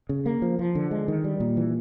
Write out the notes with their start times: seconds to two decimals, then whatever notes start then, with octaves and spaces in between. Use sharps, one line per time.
0.09 C#3
0.26 A#3
0.42 F3
0.59 F3
0.75 D3
0.91 G#3
1.08 D#3
1.24 G3
1.40 A#2
1.57 E3